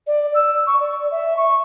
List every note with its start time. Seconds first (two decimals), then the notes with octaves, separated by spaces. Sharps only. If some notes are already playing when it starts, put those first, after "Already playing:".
0.07 D5
0.35 E6
0.67 C#6
0.80 D5
1.11 E5
1.37 C#6